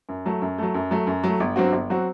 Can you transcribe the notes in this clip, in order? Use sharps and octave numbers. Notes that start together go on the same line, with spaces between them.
F#2
F#3 A3
F#2
F#3 A3
F#2
F#3 A3
F#2
F#3 A3
G1
G2 F#3 C4 F#4
G1
F#3 C4 F#4